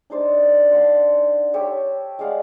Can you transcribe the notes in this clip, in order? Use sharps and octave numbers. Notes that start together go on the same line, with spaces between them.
D4 D#4 C5 D5
C5 F#5 A5 C6
G4 A4 C#5 E5
G#3 D5 F5 F#5